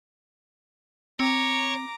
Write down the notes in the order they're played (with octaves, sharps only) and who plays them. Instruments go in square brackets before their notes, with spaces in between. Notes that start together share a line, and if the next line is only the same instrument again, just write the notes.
[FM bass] C4 [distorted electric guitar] C#5 [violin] A#5 D6